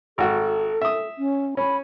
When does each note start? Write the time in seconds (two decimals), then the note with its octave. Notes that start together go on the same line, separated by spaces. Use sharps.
0.18 G#1 F#4 A4
0.81 E5 D#6
1.18 C#4
1.57 C#4 B5